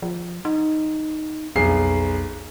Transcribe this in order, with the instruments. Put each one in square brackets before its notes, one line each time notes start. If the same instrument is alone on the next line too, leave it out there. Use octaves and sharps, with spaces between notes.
[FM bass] F3
D#4
[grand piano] B1 G#4 C7 [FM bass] F2